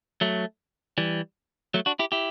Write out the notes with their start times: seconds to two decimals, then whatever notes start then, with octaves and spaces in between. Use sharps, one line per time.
0.21 F#3 A3
0.98 E3 G3
1.74 F#3 A3
1.86 D4 F#4
1.99 E4 G4
2.12 E4 G4